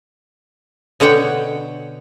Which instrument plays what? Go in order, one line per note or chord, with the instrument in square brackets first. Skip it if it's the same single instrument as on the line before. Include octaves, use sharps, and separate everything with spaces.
[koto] B2 D3 C#5 F#5 G5